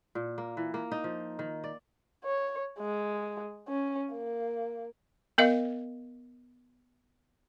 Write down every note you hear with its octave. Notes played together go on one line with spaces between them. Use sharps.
A#2
A#3
E3
A#3
D#4
F3
D#3
D5
C#5
G#3
C#4
A#3
B3 A#4 D#5 F5